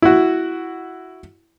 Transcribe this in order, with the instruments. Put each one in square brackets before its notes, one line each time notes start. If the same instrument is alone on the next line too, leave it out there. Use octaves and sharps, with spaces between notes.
[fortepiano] E4 F#4